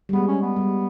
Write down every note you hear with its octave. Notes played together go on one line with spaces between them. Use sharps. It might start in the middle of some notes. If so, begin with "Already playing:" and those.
G3
G#3 B3
C#4
B3
G3